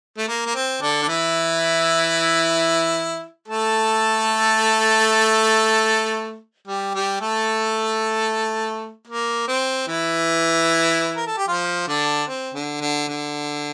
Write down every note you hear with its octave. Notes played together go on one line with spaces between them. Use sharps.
A3
A#3
A#3
C4
D3 D4
D4
E3 E4
A3 A4
G3 G4
G3 G4
A3 A4
A#3
C4
E3 E4
A#4
A4
G4
F3 F4
D3 D4
C4
D3
D3
D3